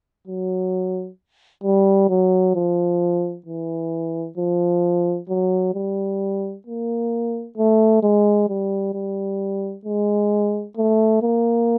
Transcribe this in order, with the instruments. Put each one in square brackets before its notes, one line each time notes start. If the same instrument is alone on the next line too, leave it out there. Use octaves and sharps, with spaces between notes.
[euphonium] F#3
G3
F#3
F3
E3
F3
F#3
G3
A#3
A3
G#3
G3
G3
G#3
A3
A#3